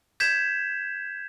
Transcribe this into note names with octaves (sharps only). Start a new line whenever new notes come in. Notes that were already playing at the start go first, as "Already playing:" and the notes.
G6 G#6 B6 E7